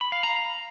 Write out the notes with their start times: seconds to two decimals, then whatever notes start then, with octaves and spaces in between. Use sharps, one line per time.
0.01 B5
0.12 F5
0.23 A#5